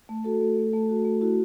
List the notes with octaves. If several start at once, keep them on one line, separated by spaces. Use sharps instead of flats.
A3
F#4 A4
A3
A3
A3
F#4
A3
E4 F#4